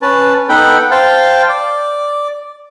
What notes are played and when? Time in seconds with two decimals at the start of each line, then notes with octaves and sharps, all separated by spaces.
0.02 C#4 B4 A5
0.49 B3 D#4 A4 F#5 G5 B5
0.91 C5 F5 G5 A5
1.49 D5